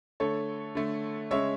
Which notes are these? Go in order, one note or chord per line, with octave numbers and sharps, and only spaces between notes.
D3 A3 A4 C#5
D3 A3
C#3 G#3 C#5 E5